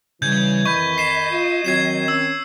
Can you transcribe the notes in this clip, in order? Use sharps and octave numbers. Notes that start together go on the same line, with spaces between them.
C#3 E3 G3 G6 G#6
F2 D#3 D#5 B5 C#6 G6
C7 E7
F4
D#3 F#3 C4 G#6 C7 E7
C#4 E6